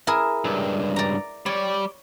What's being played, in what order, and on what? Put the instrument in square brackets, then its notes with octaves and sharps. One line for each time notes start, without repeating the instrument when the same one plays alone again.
[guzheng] E4 G#4 A#4
[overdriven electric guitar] C#2 G2
[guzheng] D5 A#5
[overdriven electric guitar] G3 D5 [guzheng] C#5